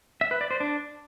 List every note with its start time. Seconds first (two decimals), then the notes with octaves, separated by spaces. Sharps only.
0.21 E5
0.31 B4
0.41 D5
0.51 C5
0.60 D4